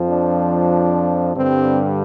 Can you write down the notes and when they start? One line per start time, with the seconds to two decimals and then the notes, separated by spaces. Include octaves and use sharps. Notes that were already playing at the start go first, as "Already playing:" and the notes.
Already playing: F2 F3
0.08 D4
1.36 G2 D3 G3 C4